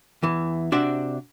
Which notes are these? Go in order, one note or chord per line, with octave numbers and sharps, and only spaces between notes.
E2 E3
C3 D4 F#4 C5 D5 E5